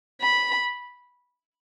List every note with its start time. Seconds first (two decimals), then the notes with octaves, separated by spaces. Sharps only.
0.21 B5